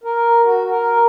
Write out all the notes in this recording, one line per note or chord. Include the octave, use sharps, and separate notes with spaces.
A#4
F#4
A#4